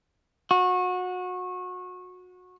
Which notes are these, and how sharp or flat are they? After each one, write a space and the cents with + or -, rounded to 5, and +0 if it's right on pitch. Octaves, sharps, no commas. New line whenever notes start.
F#4 -25